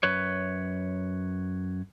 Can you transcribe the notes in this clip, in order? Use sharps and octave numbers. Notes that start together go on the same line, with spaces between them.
F#2 B4 C#5